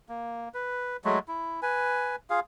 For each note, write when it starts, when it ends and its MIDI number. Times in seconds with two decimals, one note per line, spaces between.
0.09 0.49 58
0.54 0.97 71
1.04 1.19 54
1.04 1.19 56
1.04 1.19 57
1.28 1.60 64
1.62 2.16 71
1.62 2.16 80
2.30 2.40 65
2.30 2.40 68
2.30 2.40 77